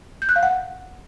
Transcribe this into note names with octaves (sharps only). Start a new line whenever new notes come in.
G6
F#6
F5
F#5